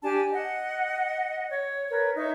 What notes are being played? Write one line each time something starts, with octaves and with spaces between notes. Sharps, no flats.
D4 G4 G#5 A5
D#5 F#5
C#5
A#4 B4 C#5
D#4 C#5 E5